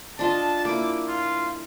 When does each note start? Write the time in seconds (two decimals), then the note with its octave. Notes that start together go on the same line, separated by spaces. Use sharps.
0.19 D4 F4 D#5 A5
0.65 A#3 E4 D6
1.08 F4